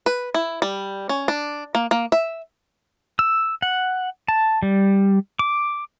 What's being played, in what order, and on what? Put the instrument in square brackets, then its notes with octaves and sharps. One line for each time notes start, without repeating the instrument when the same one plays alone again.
[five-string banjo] B4
E4
G3
C#4
D4
A#3
A#3
E5
[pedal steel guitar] E6
F#5
A5
G3
D6